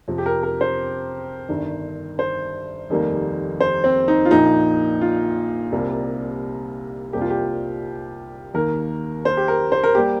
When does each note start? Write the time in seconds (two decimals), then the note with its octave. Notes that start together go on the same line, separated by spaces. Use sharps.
0.08 F2 C3 F3
0.18 G4
0.26 A#4
0.43 A#4
0.61 C5
1.49 G1 G2 D#3
2.19 C5
2.90 F1 D#2 D#3 G3 A#3
3.60 C5
3.84 C4
4.08 D#4
4.25 F4
4.31 A#1 A#2 F3 D#4
5.01 F4
5.72 C2 C3 G3 A#3
7.13 C2 C3 G3 A#3 G4
7.21 F4
7.30 G4
8.54 D#2 D#3 A#3 A#4
9.25 C5
9.37 G4
9.48 A#4
9.72 C5
9.83 A#4
9.95 G3 A#3 G4